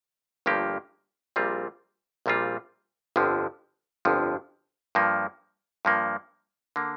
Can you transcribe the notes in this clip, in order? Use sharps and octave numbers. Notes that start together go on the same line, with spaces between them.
G1 G2 F3 A#3 G4
A#1 A#2 G3 C4 F4
A#1 A#2 G3 C4 F4
G1 F2 D3 F3
G1 F2 D3 F3
G2 F3 A#3
G2 F3 A#3
D3 A#3